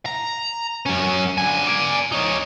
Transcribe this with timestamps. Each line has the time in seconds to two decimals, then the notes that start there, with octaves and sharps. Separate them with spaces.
0.06 A#5
0.86 F#2 C#4
1.38 D3 G#5
1.67 D5 G#5
2.12 D#4 C#5